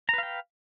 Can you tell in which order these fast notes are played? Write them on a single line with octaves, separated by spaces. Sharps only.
A#5 B4 F5 G5